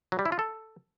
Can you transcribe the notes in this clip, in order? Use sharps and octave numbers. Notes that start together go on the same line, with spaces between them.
F#3
G3
E4
F4
A4